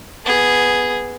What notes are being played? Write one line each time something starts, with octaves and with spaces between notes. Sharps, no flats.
B3 G#4